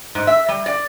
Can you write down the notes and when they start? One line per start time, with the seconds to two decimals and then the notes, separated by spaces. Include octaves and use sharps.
0.15 G#2
0.27 E5
0.48 G3
0.66 D5